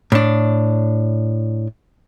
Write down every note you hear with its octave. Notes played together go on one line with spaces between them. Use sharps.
A2 D4